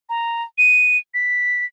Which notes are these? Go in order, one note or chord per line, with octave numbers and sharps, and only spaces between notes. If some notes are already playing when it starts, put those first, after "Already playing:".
A#5
D#7
B6